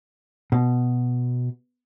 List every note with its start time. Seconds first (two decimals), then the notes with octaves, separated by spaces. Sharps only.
0.52 B2